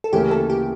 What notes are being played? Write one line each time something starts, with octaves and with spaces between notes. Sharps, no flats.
A4
D2 C#3 E3 A#3 C#4 G4
A4
G4